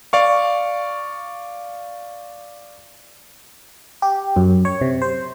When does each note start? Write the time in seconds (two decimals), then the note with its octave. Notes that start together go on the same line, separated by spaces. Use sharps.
0.13 D5 F5 C#6
4.02 G4
4.36 F#2
4.65 C#5
4.81 C3
5.02 C5